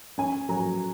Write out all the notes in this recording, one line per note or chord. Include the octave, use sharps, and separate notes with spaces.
C#4 G#5
F#3 A#5